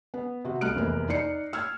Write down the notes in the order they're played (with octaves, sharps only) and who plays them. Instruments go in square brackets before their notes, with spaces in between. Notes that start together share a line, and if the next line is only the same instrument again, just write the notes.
[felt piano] B3
C3 F#4
C2 A3 F6 F#6 D7
F1 E2 C3 A#3
D#4 D5 C7 C#7
E6 F6 G#6